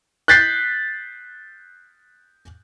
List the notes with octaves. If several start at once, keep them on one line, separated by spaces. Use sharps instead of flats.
F#6 G6 A6 B6 C7